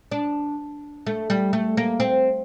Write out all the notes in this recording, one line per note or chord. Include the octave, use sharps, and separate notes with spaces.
D4
A3
G3
A3
A#3
C4